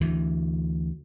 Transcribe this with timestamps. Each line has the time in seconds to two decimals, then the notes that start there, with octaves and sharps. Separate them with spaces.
0.01 D2 E3